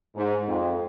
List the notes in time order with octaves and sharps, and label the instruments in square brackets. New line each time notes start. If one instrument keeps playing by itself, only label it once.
[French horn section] G#2
F2